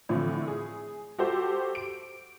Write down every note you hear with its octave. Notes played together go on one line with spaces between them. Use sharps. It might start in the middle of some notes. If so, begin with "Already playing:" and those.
A2 D3 E3 F3 C4 E4
G#4
F#4 G4 A4 C5
D7